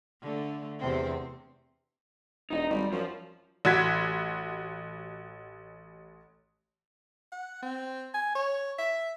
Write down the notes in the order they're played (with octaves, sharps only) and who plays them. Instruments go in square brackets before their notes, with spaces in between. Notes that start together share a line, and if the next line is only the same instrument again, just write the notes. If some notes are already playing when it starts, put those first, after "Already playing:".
[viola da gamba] D3 A3
E2 C3 C4
[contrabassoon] E1 [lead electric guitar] D#4 D#5
[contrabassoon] G#1 [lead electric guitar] G3
[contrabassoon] F#2 [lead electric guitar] F3
[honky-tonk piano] A1 F#4 G#6 B6
[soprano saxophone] F#5
C4
G#5
C#5
E5